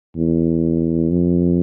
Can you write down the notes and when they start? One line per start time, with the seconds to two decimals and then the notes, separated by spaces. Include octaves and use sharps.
0.16 E2
1.11 F2